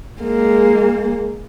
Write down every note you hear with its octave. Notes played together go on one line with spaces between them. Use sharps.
G#3 A#3